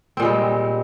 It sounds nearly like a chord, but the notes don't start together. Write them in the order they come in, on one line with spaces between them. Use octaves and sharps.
C4 A#2 G#3 G3